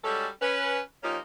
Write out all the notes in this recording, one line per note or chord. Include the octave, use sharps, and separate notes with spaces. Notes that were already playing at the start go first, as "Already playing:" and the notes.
G3 G#3 C#4 F#4 A4
C#4 B4
F3 A#3 C#4 D#4 F4 G4